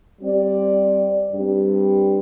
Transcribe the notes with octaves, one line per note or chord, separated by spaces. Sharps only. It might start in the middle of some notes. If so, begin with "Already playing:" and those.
G3 C4 G4 D5
G2 G3 C4